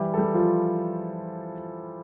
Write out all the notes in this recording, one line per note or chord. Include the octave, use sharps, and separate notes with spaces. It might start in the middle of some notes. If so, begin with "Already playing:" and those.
Already playing: E3 G3 E4 G4
A4
G3 G4
F3 F4